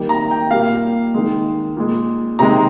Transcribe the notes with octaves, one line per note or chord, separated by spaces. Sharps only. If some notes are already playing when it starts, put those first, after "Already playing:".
Already playing: D#3 G3 A#3
A#5
G5
A#2 G3 A#3 F5
D#3 G#3
A#2 G#3
C3 D#3 G#3 A#5